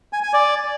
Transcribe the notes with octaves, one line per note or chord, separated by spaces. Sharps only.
G#5
G#5
D5